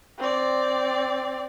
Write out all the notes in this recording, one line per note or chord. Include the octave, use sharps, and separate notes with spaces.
C4 D5